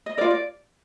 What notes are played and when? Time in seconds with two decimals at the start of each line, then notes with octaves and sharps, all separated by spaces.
0.06 D#5
0.17 F4 A#4 D5
0.31 D5